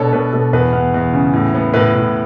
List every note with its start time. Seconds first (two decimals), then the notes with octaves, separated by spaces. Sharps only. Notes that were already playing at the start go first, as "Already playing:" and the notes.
Already playing: B2 D4 A4 B4 C#5 D5
0.13 B2 B4
0.33 B2 A4
0.53 E2 B4
0.73 E2
0.94 E2
1.13 C#3
1.34 A2
1.54 B3
1.73 A2 B4
1.94 A2